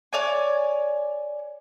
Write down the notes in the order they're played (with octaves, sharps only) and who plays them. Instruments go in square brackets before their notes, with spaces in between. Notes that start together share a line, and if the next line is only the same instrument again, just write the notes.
[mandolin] C#5 D5 G#5